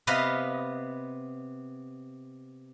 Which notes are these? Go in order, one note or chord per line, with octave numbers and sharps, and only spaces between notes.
C3 B3 B4 D#5 F5